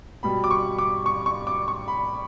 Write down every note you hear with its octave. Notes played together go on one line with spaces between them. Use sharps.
B2 G3 B5
D6
C#6
D6
C#6
C#6
D6
C#6
B5